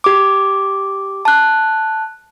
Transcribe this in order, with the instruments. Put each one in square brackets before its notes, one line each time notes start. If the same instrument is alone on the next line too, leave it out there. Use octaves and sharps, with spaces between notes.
[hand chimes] G4 D6
A5 F#6